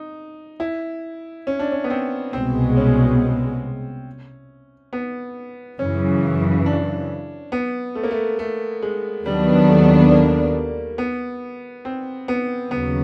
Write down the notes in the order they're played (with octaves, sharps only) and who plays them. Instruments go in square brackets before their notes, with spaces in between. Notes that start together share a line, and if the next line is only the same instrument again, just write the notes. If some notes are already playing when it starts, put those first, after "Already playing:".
Already playing: [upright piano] D#4
E4
C#4
D4
C#4
B3
C4
[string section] C2 B2 G#3 [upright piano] C4
[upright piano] C#4
B3
[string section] F#2 C#3 E3 [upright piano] C#4
[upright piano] D4
B3
A3
A#3
A3
A3
G#3
[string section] D#2 D#3 F#3 B3 D4 [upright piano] G3
[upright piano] A3
A#3
B3
C4
B3
[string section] D#2 C#3 F#3 [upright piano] B3